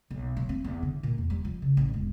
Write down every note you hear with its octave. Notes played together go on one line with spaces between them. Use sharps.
B1
F#3
C4
E2
D3
A#2
E2
G3
F3
C#3
A1
E1